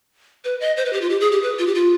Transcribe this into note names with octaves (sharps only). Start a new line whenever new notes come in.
B4
D#5
C5
B4
G4
F4
G4
G#4
G4
B4
F4
G4
F4